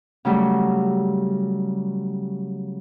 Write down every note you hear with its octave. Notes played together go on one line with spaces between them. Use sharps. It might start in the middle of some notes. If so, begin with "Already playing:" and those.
C#3 F#3 G3 A3